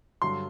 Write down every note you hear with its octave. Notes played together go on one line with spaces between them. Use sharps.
G2 D3 F#3 C6